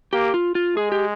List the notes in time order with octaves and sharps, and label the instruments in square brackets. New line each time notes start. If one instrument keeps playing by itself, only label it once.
[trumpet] A#3 [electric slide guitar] G4
[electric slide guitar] F4
F4
[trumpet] G#3 [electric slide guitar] G#4
[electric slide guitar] G4